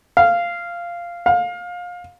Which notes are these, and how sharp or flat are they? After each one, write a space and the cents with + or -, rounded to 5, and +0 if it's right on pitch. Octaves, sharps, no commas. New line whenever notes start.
F5 -10
F5 +25